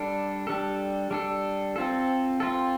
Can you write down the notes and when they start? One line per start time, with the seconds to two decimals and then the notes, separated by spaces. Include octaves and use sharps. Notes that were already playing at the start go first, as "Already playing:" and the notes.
Already playing: G3 D4 A4
0.47 G3 D4 A4
1.11 G3 D4 A4
1.76 C4 F4 A4
2.40 C4 F4 A4